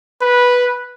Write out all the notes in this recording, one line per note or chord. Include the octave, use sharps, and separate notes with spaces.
B4